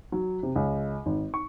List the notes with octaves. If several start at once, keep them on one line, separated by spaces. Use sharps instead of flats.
F#3
C3
C#2
G#1
C#6